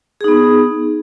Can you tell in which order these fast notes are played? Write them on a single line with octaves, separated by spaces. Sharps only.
G#4 D#4 B3